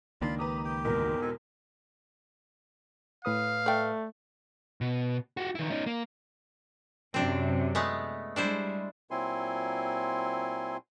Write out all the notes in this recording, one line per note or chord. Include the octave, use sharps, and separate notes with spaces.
C#2 D#3 A#3 D4 F4 B5 C6
G4 B4 A#5 D#6
G4 G5
E2 G#2 B2 A#4
C4 A4 G#5
A2 B4 F5 D#6
A3 D5 G5
B2
F#4 G4
D#3 E4
C#4 D#4
A#3
F#2 C3 C4 D4
G#3 A3 B3
G3 G#3 D4 E4 C5
A#2 F#3 C4 E4 G#5 C6